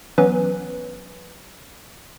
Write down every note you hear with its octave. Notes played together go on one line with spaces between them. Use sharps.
E3 F#3 B3 C#4 B4